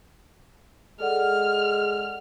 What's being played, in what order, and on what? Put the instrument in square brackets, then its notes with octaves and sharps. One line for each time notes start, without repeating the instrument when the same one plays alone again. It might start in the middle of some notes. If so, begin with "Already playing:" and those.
[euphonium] G#3 [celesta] A4 D5 F#5 [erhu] F6